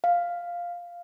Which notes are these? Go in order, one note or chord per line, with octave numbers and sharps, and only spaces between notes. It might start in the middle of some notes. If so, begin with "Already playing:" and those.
F5